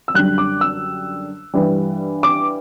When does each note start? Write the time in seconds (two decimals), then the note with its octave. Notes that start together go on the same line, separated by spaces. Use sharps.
0.08 E6
0.14 F#2 D3 G3 F#6
0.38 D6
0.61 E6
1.54 G2 E3 G3
2.23 D6